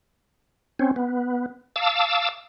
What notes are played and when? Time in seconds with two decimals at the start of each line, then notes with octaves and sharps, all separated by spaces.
0.79 C4 C#4
0.96 B3
1.76 F5 A5 D6 E6